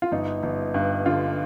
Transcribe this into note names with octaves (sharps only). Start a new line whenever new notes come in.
F4
G1 D#4
G1
G2
D3 F4